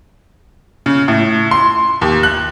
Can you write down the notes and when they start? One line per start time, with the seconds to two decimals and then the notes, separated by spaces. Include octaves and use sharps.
0.86 C#3
1.08 A2
1.51 C6
2.01 D#2
2.23 F#6